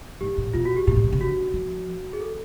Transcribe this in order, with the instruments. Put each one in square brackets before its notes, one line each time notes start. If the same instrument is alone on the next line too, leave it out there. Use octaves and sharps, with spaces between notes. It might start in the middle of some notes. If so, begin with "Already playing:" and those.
[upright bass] G#2 [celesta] G4
[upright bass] A#2
[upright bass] B2 [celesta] F4
[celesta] F#4
G4
[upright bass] A#2 [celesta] G4
[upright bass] A2
B2
C3
[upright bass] D3 [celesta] F#4
[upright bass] F3
[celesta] G#4
A4